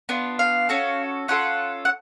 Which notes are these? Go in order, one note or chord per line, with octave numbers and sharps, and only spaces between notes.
B3 D4 F4
F5
C#4 F#4 A4
C#4 F4 A4 F#5
F#5